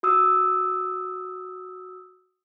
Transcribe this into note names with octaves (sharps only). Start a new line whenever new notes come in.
F#4 D#6 E6